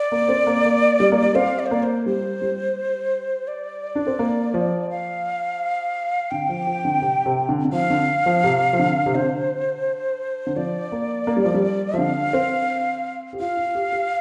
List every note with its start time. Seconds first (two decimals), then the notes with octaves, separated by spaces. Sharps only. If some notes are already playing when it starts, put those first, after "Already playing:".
Already playing: D5
0.12 A#3
0.29 C4
0.47 A#3
0.65 A#3
1.00 G3
1.12 A#3
1.23 G3
1.35 C4 F5
1.59 D5
1.66 C5
1.71 A#3 D5
1.83 C5
2.06 G3 C5
2.42 G3
3.47 D5
3.95 D4
4.07 C4
4.19 A#3
4.54 F3
4.90 F5
6.31 D3 G5
6.49 F3
6.67 F3
6.85 D3
7.02 C3
7.26 C3
7.49 D3
7.65 D3
7.72 F3 F5
7.90 D3
8.26 F3
8.44 C3
8.73 F3
8.79 D3
9.06 C3
9.15 D3 C5
10.47 D3
10.56 F3 D5
10.92 A#3
11.27 A#3
11.36 G3
11.45 F3
11.54 G3
11.94 F3
11.98 D3 F5
12.33 C4
13.33 G4
13.40 F4 F5
13.57 F4
13.75 G4
13.92 G4